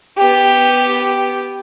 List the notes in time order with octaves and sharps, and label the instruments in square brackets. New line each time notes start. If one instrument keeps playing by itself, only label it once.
[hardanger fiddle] B3 G4